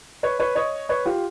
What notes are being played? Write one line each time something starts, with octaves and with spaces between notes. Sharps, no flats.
B4 C#5
B4 C#5
C#5 D#5
B4 C#5
F4 G4